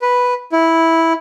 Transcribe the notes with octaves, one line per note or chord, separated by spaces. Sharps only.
B4
E4